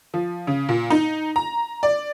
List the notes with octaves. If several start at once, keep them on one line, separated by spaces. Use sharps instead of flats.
F3
C#3
A#2
D#4
A#5
D5